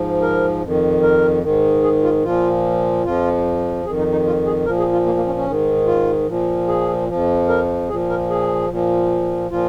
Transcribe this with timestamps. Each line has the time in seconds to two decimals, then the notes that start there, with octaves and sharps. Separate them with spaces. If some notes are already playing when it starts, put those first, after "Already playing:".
Already playing: G#2 F3
0.22 A#4
0.62 F2 D#3
1.03 A#4
1.43 G#2 D#3
1.83 G#4
2.03 F4
2.23 A#2 F3 F4
3.04 F2 F3 F4
3.85 F2 D#3 G#4
3.99 D#4
4.12 D#4
4.26 F4
4.46 G#4
4.65 A#2 F3 A#4
4.79 G#4
4.93 F4
5.06 A#3
5.17 A#3
5.27 C#4
5.37 C#4
5.46 G#2 D#3
5.87 F4
6.28 A#2 F3
6.68 G#4
7.09 F2 F3
7.48 A#4
7.89 A#2 G#4
7.92 F3
8.09 A#4
8.30 G#4
8.70 A#2 F3
9.50 A#2 F3 F4